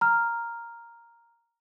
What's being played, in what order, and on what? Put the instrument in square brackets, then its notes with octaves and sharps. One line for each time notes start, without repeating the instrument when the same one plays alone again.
[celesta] A#5 F6